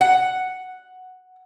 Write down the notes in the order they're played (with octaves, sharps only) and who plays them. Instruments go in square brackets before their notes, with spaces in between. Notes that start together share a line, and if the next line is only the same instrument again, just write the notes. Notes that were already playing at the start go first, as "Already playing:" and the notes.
[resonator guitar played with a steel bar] F#5